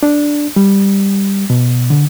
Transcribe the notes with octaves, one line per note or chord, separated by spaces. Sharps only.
D4
G3
B2
D3